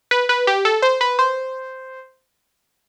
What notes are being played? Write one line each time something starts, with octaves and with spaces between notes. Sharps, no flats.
B4
B4
G4
A4
C5
B4
C5